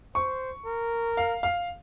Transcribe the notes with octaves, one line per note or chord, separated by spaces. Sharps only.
C5 C#6
A#4
F5
F5